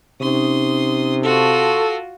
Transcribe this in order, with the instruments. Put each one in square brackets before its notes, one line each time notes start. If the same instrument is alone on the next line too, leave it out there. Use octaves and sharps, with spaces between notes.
[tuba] C3 [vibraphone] C#4 D#4 [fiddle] C6 D#6
[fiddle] F4 F#4 [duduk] A4 [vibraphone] A5 C6 C#6